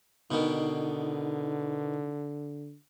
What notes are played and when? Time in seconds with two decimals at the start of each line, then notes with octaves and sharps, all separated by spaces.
0.31 B2 D3 D#3 D#4